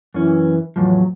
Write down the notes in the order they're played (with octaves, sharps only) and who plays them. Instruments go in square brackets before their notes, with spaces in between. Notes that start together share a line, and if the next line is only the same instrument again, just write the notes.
[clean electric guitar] F#2 C#4 [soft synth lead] E3
[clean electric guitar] E2 A2 F3 [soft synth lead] F#3